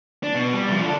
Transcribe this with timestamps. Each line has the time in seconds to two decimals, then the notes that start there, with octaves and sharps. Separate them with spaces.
0.23 D4
0.35 B2
0.53 G3
0.68 C2 F3
0.82 D4 A4